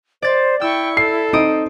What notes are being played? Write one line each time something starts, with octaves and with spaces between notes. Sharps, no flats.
C5 D5 A6
E4 G5 C#6 E6
A4 C7
C4 D#4 D#6 D7